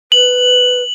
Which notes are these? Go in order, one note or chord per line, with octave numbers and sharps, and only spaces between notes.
B4 F#7